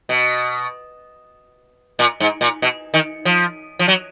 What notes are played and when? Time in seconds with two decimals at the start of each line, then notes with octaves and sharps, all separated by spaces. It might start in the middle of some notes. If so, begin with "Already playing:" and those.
0.09 B2
1.99 A#2
2.20 G#2
2.41 A#2
2.62 B2
2.94 D#3
3.25 F3
3.79 F3
3.88 F#3